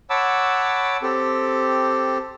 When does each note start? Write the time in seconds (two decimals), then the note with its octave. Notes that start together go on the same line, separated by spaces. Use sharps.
0.10 C#5 F#5 A5 B5 D6 E6
1.02 C4 G4 A4